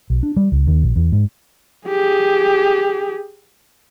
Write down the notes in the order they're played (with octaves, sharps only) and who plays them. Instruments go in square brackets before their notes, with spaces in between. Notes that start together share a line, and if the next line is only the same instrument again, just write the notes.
[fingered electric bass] B1
D4
G3
C#2
D#2
A#1
E2
G#2
[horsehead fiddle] G4 G#4